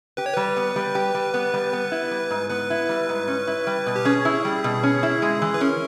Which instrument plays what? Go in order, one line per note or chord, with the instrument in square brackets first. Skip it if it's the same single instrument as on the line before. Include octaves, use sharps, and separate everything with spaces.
[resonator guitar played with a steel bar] G4 [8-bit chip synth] B4
[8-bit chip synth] C#5
[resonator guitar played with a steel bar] G3 [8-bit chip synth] B4
[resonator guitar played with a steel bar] B3
G3
G4
G3
B3
G3
B3
E4
G3
G#2
[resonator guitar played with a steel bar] B3 [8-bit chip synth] B4
[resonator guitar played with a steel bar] E4
G3
G#2
C#4
E4
G3
B2
[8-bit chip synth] G4
[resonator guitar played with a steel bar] C#4 [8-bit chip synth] G#4
[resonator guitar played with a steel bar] E4
G3
B2
C#4
E4
G#3
E3
[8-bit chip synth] B4
[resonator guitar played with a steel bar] C#4 [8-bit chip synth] A#4